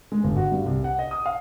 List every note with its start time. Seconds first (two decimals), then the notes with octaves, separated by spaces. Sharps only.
0.12 G#3
0.24 G1
0.36 F#4
0.52 G2
0.66 C2
0.84 F#5
0.99 D#5
1.11 D#6
1.26 F5